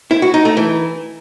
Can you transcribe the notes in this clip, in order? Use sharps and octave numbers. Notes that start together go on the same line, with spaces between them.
E4
F#4
D#4
A3
E3